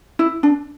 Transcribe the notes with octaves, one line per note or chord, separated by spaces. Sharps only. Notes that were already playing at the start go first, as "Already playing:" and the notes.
E4
D4